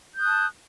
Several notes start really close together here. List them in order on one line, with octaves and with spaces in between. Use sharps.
G6 D#6 F#6 A5